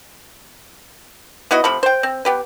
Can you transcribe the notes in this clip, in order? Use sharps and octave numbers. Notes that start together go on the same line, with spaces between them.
B3 E4 F#4 D#5
C3 F3 A3 B5
C5 G5
C4
B3 G4 B4